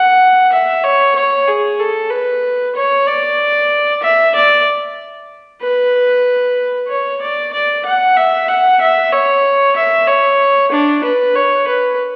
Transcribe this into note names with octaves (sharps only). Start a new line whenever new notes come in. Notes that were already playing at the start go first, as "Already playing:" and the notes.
Already playing: F#5
E5
C#5
C#5
G#4
A4
B4
C#5
D5
E5
D5
B4
C#5
D5
D5
F#5
E5
F#5
E5
C#5
E5
C#5
D4
B4
C#5
B4